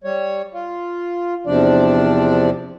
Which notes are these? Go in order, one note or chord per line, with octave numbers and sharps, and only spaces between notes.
G3 C#5
F4
E2 C3 F3 D4 D5